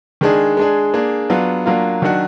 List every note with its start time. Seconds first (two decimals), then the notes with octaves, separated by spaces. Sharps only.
0.21 D#3 G#3 D4 G#4
0.57 G#3 D4 G#4
0.94 A#3 D4 G#4
1.30 F#3 B3 D4 F4
1.66 F#3 A#3 D4 F4
2.02 D#3 F#3 D4 F#4